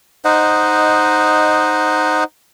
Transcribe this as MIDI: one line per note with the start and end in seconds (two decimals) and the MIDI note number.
0.25 2.24 63
0.25 2.24 72
0.25 2.24 75
0.25 2.24 78